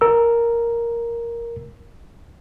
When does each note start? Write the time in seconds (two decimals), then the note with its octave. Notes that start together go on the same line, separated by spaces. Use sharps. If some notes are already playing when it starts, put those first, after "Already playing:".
0.01 A#4 E6